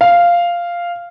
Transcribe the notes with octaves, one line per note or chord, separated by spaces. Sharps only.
F5